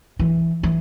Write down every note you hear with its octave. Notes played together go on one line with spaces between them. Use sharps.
E3
E3